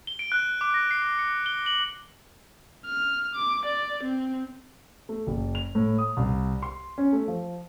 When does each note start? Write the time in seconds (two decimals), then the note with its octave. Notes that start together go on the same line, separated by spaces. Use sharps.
0.07 G7
0.19 D7
0.32 F#6
0.61 D6
0.74 A#6
0.91 C7
1.19 C#7
1.46 G7
1.66 F#7
2.85 F6
3.35 D6
3.65 D5
4.03 C4
5.09 A3
5.27 F#1
5.55 F7
5.75 A2
5.98 D#6
6.17 C2
6.62 C6
6.98 C#4
7.13 A3
7.28 F3